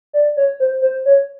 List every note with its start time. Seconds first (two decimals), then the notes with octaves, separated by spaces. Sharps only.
0.13 D5
0.37 C#5
0.60 C5
0.82 C5
1.05 C#5